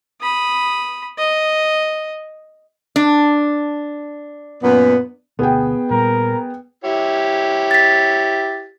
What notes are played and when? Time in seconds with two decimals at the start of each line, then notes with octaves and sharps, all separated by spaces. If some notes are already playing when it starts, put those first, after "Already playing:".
0.21 B5 D#6
1.18 D#5
2.96 D4
4.63 F#2 A#2 B3
5.39 D2 B2 B3 G#4 G5
5.90 A#2 G3 A#4
6.84 E4 G4 C#5
7.71 A6 B6